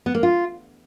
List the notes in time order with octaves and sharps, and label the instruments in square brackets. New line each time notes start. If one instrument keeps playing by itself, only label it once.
[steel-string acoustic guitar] B3
A#3
F4